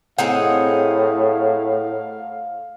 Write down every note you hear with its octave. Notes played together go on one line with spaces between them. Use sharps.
A2 C4 D#4 G#4 F5 F#5